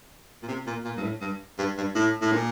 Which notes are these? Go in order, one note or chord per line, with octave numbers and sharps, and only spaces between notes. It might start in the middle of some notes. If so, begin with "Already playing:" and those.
A#2
C3
A#2
A#2
G2
A2
G2
G2
G2
A2
A2
A#2